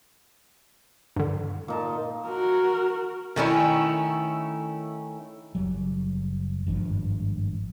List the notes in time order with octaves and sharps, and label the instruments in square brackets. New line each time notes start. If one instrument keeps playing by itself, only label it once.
[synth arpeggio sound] G2 D3
[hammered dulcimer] A#2 D#4 A5
[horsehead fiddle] F#4 A#4
[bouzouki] D#3 A3 C#4 E4
[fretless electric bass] F#1 F#3 G3
G#1 G2 D#3 F3